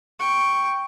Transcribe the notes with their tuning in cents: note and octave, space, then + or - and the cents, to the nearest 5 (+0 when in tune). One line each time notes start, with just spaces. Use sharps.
G5 +0 C#6 +0